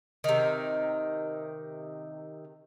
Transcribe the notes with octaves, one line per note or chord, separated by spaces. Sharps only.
C3 D#3